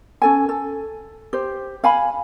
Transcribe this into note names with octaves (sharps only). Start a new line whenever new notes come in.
C#4 A4 G#5
A4
G4 C5
F5 G#5 B5